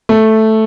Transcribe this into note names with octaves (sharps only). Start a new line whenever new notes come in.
A3